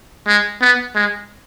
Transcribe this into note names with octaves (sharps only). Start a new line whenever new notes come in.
G#3
B3
G#3